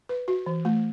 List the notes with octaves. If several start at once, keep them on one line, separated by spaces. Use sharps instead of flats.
B4
F#4
E3
A3